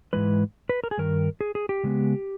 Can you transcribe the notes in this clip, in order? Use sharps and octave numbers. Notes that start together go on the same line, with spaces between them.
G#2 E3 G#3 B4
B4
A#4
G#4
G2 D#3 A#4
G#4
G#4
G4
C#3 G#3 B3